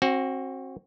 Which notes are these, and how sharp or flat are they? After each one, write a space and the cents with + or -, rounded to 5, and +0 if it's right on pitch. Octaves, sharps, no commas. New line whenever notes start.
C4 +30 F#4 +0